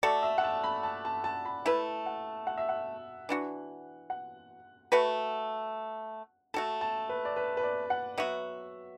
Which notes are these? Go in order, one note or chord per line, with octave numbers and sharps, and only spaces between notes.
A3 F#4 A4 D5
E5
F#5
A5
B5
A5
A5
A5
B5
A3 E4 B4 A5
F#5
F#5
E5
F#5
E3 D4 F#4
F#5
A3 F#4 B4
A3 F#4 A4 A5
A5
B4
D5
B4
B4
D5
F#5
F#3 B3 F#4 E5